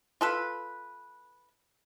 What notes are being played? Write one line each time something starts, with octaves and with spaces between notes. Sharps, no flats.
F4 A4 B4